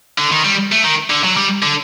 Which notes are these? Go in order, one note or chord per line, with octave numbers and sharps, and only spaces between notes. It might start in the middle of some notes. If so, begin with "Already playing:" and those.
D3
D#3
G3
A3
D#3
D3
F#3
G3
D3